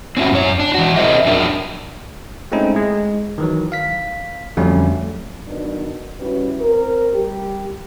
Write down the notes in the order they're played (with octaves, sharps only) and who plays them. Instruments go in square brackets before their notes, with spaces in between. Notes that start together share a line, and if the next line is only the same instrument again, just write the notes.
[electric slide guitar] C4 C#4 E4 F#4
F#2 C#5
D4
E3 F#4
C4 G#4 A#4 C5 D#5 E5
F2 F#3 D4 A#4 D5
[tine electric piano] G#3 A3 C4 C#4 D#4 E4
G#3
D#3 E3 F#3
F5 B6
F2 D3 F#3 G3 A3 C#4
[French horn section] B2 D#3 F#3 D4
G3 C#4 E4 F#4 B4
C4 A#4
G3 G4